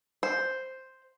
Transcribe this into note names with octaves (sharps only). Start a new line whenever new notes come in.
C5